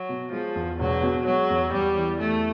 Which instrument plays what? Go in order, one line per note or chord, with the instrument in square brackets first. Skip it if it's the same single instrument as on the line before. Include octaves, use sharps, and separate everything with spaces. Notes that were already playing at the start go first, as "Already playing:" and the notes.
Already playing: [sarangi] F#3
[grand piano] B2
[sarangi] F3 [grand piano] G#3
[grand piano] E2
[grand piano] E1 [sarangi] F#3
[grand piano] B2
[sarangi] F#3 [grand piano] G#3
[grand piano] E2
[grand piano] E2 [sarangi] G3
[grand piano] E3
[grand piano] E2 [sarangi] A3